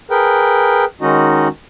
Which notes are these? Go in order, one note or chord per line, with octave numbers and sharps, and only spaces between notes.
G#4 A#4 B4 G5
D#3 G#3 C#4 D#4 F#4 D#5